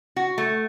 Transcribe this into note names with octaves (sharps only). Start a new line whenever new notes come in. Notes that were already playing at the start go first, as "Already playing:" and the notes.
F#4
A3